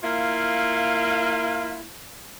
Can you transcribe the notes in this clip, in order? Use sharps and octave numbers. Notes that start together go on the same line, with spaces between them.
A#3 E4 F4